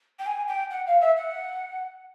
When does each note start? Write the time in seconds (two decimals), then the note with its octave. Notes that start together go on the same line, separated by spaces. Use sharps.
0.19 G5
0.26 G#5
0.48 G5
0.70 F#5
0.86 F5
1.01 E5
1.16 F#5